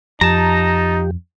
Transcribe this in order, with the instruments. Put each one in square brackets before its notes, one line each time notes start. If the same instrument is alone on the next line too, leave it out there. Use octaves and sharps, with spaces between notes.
[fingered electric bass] F2 [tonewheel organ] F3 G4 [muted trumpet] D#4 [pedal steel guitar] A5 A#5